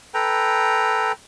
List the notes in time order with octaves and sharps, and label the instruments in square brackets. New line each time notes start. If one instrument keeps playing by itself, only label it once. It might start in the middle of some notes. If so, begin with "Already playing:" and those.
[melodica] A4 B4 G5 A#5